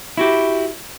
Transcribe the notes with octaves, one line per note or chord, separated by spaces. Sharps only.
E4 F#4 G4